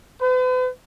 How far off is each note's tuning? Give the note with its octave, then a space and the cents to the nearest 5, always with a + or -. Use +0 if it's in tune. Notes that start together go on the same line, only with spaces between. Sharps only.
B4 +45